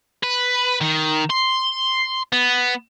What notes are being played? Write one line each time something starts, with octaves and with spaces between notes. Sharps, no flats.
B4
D#3
C6
B3